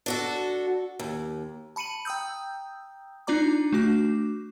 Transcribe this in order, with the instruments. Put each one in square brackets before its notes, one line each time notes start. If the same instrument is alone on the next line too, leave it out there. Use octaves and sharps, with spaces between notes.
[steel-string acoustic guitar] D4 F#4 A4
D#2
[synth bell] A5 B5 C#7 D#7 F#7
G5 A#5 D#6 E6 G6
D4 D#4 F4 D5 A#5 D6
A3 D4 F#4 D6